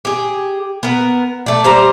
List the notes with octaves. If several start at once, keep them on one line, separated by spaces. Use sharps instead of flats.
G4 G#4
B3 A#4
A3 D5
G3 C5 A#5